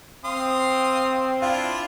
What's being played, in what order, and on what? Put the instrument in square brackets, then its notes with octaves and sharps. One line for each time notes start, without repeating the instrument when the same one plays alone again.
[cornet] C4 [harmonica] F5 C6 D#6
[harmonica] D4 E4 F4 [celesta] F5